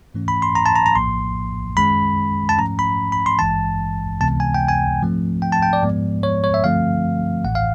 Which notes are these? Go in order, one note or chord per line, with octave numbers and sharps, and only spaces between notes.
G#2 E3 A3 C#4
B5
C6
A#5
A5
A#5
A#5
A#1 A2 F3 A#3 C6
F#2 D#3 G#3 C#4 B5
A5
G#2 F3 A3 C#4 A#5
B5
B5
C6
G#1 G2 E3 G#3 A5
C#2 C3 E3 G#3 B3 A5
G#5
G5
G#5
G#2 F3 A3 C4
G5
A5
G5
D5
G#2 F3 G#3 B3
C#5
C#5
E5
G2 D3 F3 A3 C4 F5
A1 A2 E3 F#5
F5